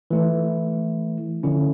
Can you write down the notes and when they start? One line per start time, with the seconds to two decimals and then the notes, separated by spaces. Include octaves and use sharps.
0.10 E3 A3 E4
1.43 D3 F3 C#4 E4